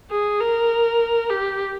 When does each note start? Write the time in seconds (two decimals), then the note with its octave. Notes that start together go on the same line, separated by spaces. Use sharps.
0.10 G#4
0.40 A#4
1.30 G4